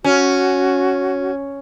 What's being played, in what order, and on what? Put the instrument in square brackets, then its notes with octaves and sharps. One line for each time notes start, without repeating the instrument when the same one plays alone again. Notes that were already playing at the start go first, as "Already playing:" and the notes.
[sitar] C#4 [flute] F#4